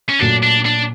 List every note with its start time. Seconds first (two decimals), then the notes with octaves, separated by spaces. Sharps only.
0.09 C#4
0.19 A#2 F#3 A3 D4
0.43 D4
0.65 D4